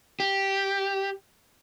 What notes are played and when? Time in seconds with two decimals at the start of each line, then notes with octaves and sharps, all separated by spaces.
0.20 G4